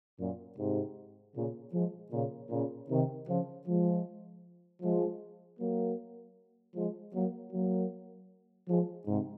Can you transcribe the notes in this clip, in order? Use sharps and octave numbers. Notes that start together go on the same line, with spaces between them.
F#2 A#2
G#2 C3
A#2 C#3
F3 G#3
A#2 C#3
A#2 C#3
C3 D#3
C#3 F3
F3 G#3
F3 G#3
F#3 A#3
F3 G#3
F#3 A#3
F#3 A#3
F3 G#3
G#2 C3